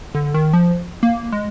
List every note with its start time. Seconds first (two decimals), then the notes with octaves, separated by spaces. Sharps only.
0.15 D3
0.34 D#3
0.53 F3
1.03 A#3
1.32 G#3